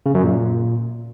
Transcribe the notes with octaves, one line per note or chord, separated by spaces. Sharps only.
C#3
F#2
A#2